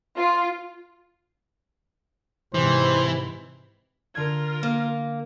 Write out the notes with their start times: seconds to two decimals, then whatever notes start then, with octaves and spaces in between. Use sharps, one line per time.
0.16 F4
2.54 G#2 C3 E3 C5
4.15 D3 F4 A#4 G#6
4.63 A#3